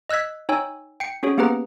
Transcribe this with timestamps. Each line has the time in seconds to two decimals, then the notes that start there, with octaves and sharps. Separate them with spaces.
0.09 D#5 E6 F#6 G#6 B6
0.49 D#4 C#5 G5 G#5 E6
1.00 G5 C7 C#7
1.23 C#4 F#4 G#4 C#5
1.38 A#3 B3 G4 G#4 B4 A#5